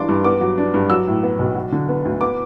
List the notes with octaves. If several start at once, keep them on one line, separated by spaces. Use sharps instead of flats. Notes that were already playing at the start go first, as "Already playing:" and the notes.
Already playing: E3 G3 D4 C6 D6
G2
B3 D6
F#3
D4
G2
F#3 E6
A2
B3
B1
F#3
D3
B3
D2
B3 D6